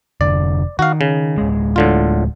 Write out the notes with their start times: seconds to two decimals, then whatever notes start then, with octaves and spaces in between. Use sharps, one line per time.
0.21 F1 D3 D5
0.79 D#3 F#4 F5
1.01 C#3
1.38 D1 G#3
1.76 A2 D3 F4